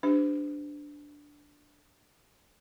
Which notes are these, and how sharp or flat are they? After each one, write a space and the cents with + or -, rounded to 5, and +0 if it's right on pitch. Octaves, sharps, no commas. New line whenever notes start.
D4 +0 G4 +0 C5 -45